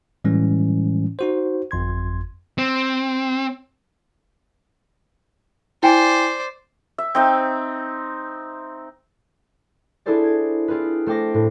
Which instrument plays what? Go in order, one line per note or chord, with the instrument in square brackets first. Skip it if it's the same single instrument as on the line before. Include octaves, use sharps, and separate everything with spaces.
[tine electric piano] A2 E3 G3 G#3 C#4
D#4 F#4 C5
G1 F2 C6 G#6
[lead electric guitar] C4
[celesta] E4 G5 G#5 [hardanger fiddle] C5 D5
[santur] E5
C4 D#4 E5
[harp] D4 E4 G#4 A4 C5 D5
G#6
C4 F4 G#4 B4
A3 C5 G5 D6 A#6
A2